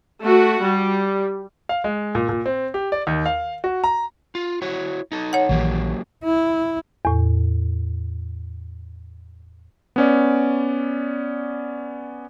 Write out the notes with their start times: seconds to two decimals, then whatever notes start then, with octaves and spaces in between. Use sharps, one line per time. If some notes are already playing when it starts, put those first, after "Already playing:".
0.22 A3 F#4
0.62 G3
1.69 F5
1.84 G#3
2.15 A#2
2.29 A#2
2.46 C4
2.74 G4
2.92 D5
3.07 D#2
3.26 F5
3.64 F#4
3.84 A#5
4.35 F4
4.62 E4 F#4 C#5
5.12 D#4 A4
5.33 C#5 F#5
5.49 A#1 D#3 E3 F#3 A#3 G4
6.24 E4
7.05 E2 A2
9.96 B3 C#4 D5